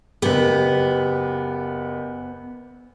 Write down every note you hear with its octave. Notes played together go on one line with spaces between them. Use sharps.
F#1 B3 G4